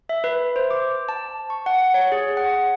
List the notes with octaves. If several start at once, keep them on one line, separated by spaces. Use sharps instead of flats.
E5
B4
C5
D6
A5
C#6
F#5
C#5
G#4
F#5